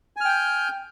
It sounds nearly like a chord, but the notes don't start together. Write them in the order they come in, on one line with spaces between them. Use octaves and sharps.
G#5 F6 G5 G6